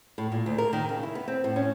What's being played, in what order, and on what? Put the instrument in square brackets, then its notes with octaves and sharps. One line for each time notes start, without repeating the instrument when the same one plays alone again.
[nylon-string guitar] A2
A#2
D2
A#4
D#3
C#3
E4
B3
C4
A2
C#4